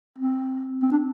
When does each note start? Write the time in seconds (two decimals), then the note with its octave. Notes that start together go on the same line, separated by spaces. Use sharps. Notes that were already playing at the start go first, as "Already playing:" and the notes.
0.18 C4
0.82 C4
0.92 D4